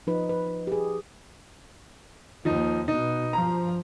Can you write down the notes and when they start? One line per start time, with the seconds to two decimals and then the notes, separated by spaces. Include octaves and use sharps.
0.07 F3 D#4 B4
0.29 B4
0.67 G4 G#4
2.45 D#2 F3 D#4
2.88 B2 D#4
3.33 G2 F3 A#5